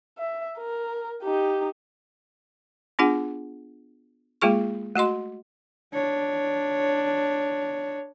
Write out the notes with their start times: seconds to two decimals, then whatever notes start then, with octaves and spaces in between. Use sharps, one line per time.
0.18 E5
0.59 A#4
1.23 D#4 G4
2.99 B3 D4 F4 G#4 F#5
4.42 G#3 A#3 F4 G#4 C#6
4.96 A3 F#4 D#5 C6
5.93 D4 C#5